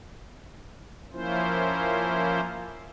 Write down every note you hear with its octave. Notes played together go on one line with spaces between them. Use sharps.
F3 A#3 C#4 E4 F4 C5